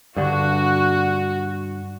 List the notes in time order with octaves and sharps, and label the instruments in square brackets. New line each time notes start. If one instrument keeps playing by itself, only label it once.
[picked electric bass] G2 D3 [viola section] F#4